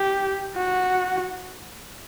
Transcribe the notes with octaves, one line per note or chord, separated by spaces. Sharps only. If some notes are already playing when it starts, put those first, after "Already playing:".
Already playing: G4
F#4